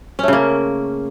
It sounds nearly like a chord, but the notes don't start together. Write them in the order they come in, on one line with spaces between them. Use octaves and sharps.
C#4 A3 C#3 A#3